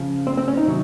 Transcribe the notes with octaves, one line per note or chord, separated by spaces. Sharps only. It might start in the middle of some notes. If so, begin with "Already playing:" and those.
Already playing: C#3 F3
C4
C4
C#4
D#4
C3 D#3 F#3